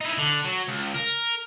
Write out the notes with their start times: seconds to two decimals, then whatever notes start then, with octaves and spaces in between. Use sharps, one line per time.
0.01 D#4 E4
0.18 D3
0.45 F#3
0.68 C#2
0.94 A#4